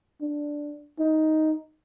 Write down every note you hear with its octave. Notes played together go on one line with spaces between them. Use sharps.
D4
D#4